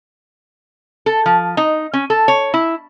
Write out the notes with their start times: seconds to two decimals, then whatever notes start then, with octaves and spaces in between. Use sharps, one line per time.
1.06 A4
1.26 F3
1.57 D#4
1.93 C#4
2.10 A4
2.28 C#5
2.54 E4